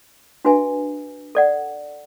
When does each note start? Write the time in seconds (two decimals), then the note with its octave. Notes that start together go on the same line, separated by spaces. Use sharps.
0.45 D4 F#4 B4 E5 G#5
1.35 A4 D5 F#5